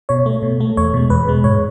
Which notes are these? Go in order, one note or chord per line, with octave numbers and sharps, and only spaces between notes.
B2 C#5
A3
B2
A3
E2 C#5
B2 G#3
E2 B4
B2 G#3
G#2 C#5